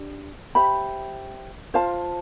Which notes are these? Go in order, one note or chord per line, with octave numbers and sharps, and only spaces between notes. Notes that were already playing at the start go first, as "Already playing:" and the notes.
Already playing: D4 G4
G4 C5 E5 B5
F4 C5 F5 A5